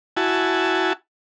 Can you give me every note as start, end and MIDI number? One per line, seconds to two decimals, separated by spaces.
0.17 0.93 64
0.17 0.93 66
0.17 0.93 80
0.17 0.93 81